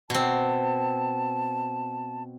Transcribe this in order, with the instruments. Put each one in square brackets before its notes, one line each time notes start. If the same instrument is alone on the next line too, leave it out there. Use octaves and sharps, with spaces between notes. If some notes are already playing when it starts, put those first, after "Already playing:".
[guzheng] B2 C4 [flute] A5